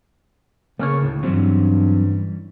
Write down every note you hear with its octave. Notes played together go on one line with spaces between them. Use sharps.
C#3 A3 A#3 C#4 C#5
D2 A2
G2 E3 F#3 G3 C4 C#4